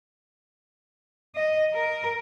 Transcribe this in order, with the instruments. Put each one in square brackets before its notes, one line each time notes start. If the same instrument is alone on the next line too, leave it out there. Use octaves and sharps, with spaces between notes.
[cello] D#5
A#4